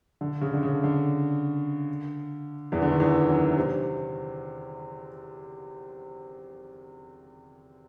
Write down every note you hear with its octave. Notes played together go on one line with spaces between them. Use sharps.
D3
C#3
D3
C#3
D3
E2 E3
D3
D#3
E2 E3
F#2 F#3
C3 C4